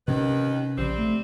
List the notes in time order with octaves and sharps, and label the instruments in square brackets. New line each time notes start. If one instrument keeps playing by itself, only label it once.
[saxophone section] D#2 D#3 B4 [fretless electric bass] C3 C#4
[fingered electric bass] A#1 C#3 [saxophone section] G3 C4
[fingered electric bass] A3